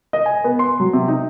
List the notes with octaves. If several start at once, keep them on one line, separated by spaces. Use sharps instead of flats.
D#5
G#5
B3
C6
F#3
C3
D#4